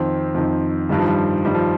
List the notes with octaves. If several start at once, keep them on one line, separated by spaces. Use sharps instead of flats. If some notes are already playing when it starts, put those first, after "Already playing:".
Already playing: F2 D#3 C4
F2 D#3
G2 D#3 G3
F3
G3
G2 D#3 G3
F3